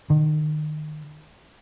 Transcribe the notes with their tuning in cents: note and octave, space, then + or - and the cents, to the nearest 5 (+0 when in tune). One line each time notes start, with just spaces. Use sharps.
D#3 -30